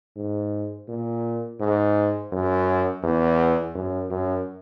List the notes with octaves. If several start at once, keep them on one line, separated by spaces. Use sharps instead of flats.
G#2
A#2
G#2
F#2
E2
F#2
F#2